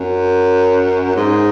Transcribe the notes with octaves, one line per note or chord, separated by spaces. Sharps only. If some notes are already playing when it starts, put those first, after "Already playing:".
Already playing: F#2
G#2